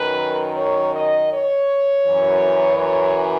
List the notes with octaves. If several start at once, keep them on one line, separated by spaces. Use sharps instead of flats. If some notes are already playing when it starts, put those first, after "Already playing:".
Already playing: F#2 D#3 B4
C#5
D#5
C#5
F#2 E3
C#5